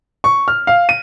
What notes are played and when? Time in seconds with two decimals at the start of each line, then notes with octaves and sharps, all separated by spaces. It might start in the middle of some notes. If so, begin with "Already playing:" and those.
0.24 C#6
0.48 F6
0.67 F5
0.89 D#7